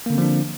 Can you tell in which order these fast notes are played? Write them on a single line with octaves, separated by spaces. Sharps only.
A#3 D3 C4 F3 D4